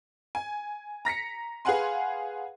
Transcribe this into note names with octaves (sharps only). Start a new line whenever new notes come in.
G#5
A#5 A#6 B6 C#7
G#4 B4 F5 F#5 G#5 C6